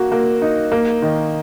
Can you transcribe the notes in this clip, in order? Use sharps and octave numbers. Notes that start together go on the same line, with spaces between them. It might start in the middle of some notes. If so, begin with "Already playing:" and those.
Already playing: A#3 F#4
A#3
D#4
A#3
D#3